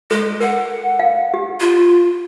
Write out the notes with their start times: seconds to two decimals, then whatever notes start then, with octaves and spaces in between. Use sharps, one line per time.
0.11 G#3 A4
0.40 A#4 F#5
0.99 F5
1.34 G4
1.60 F4